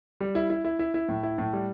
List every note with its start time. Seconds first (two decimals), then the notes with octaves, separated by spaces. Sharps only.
0.20 G3
0.35 E4
0.50 E4
0.65 E4
0.79 E4
0.94 E4
1.09 A2
1.23 E4
1.38 A2
1.53 G3